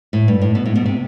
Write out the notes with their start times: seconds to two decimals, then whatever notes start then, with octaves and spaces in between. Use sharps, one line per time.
0.13 A2
0.28 G2
0.42 A2
0.55 B2
0.66 A2
0.76 B2
0.86 C3